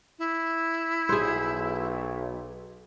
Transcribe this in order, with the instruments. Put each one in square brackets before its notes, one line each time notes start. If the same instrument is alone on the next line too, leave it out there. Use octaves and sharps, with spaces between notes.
[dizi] E4
[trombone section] B1 [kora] G#4 C5